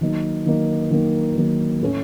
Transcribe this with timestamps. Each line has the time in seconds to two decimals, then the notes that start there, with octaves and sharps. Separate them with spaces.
0.01 D#3 F#3 A#3 D#4
0.46 D#3 F#3 A#3 D#4
0.91 D#3 F#3 A#3 D#4
1.36 D#3 F#3 A#3 D#4
1.81 A2 A3 C#4